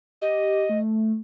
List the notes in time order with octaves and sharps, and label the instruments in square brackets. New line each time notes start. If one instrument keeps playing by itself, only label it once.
[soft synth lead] G4 [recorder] D#5
[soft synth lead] A3